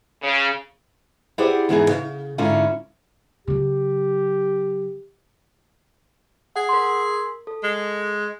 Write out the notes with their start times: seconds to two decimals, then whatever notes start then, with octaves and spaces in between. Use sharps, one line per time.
0.22 C#3
1.38 E4 G4 G#4 C5 D5 F#5
1.69 E2 G#2 E3 B3 E4 G#4
1.89 C#3
2.38 G#2 D3 C#4 E4 F4
3.48 C#3 F#3 G4
6.56 G#4 F#5
6.69 A#4 C6
7.47 A4
7.63 G#3